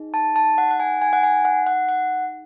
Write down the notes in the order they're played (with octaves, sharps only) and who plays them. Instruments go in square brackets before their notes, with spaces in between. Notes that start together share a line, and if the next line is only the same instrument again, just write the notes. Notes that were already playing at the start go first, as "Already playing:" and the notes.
Already playing: [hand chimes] D#4 G#4
A5
A5
F#5
F#5
G#5
G#5
F#5
G#5
F#5
F#5
F#5